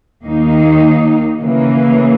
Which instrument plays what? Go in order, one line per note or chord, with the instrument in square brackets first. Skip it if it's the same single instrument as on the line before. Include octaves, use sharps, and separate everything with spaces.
[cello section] D#2 D#3 A#3 D#4
C#3 E3 A#3